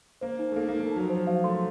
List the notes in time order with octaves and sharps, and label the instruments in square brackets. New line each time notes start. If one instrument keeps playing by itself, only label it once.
[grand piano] A#3 [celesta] C5
[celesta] D#4
[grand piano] A3
[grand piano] A#3 [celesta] A4
[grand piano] A#3
[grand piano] A3 [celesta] D#4
[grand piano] F#3 [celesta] A5
[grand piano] F3
[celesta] C5
[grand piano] F3
[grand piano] F#3 [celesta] F5
[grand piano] A3 [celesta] C6